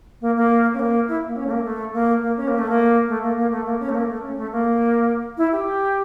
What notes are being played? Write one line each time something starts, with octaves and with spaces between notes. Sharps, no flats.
A#3
A#3
C#4
A#3
E4
A#3
C#4
A3
A#3
A3
A#3
A#3
C#4
A#3
A3
A#3
A3
A#3
A#3
A3
A#3
C#4
A3
A#3
A3
C#4
A3
A#3
E4
G4